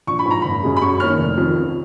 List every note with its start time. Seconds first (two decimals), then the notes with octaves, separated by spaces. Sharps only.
0.07 A#1 C#6
0.19 B5
0.26 G#2 F3 A#5
0.42 F#1 B5
0.63 F#2 C#3 G#3
0.77 B5
0.82 F#2 C#6
1.00 D#3 A#3 C#4 F6
1.18 F1
1.37 F2 D#3
1.56 C#2